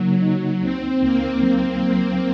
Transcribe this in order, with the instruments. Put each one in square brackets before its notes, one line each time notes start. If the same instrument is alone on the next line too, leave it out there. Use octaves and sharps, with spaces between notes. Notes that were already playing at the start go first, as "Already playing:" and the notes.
Already playing: [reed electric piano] C#3 A#3 D#4 [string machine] F#3
[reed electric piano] D#4
[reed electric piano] C#2 [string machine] C4
[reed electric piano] C#2 [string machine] A#3
[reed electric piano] F#3 [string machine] A#3
[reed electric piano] F#3